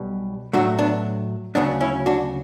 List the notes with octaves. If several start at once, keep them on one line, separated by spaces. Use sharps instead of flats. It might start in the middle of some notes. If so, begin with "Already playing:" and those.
Already playing: B1 B2 G3
A2 F#3 A3 D4 F#4
B3 D4
D2 C#3 F#3 B3 D4
C#4 E4
D4 F#4